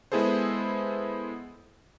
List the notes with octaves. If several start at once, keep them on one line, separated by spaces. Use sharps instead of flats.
G#3 B3 E4 G#4 A4 C5